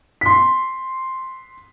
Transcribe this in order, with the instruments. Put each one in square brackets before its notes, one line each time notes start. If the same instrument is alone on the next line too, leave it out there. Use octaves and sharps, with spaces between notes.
[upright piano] C6 B6